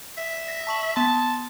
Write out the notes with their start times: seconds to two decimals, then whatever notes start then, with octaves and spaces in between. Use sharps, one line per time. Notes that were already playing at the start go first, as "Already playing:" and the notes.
0.17 E5
0.48 A#6 B6
0.67 A5 C#6 F#7
0.96 B3 A5 C6